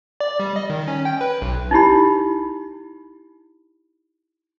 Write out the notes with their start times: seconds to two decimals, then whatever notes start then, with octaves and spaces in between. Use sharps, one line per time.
0.20 D5
0.40 G3
0.56 D#5
0.70 D#3
0.88 C#4
1.05 G5
1.21 B4
1.42 B1
1.71 D#4 E4 G4 B5